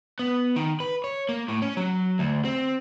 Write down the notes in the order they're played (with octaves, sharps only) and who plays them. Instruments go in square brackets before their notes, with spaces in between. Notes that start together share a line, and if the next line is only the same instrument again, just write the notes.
[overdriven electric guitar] B3
D#3
B4
C#5
A#3
A2
C#4
F#3
D2
C4